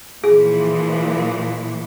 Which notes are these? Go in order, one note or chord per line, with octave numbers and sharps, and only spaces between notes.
A#2 E3 F3 G#4